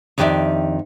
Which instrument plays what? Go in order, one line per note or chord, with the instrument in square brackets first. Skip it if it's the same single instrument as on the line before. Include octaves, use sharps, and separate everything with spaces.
[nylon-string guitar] F2 D#3 D4 G4 D5 E5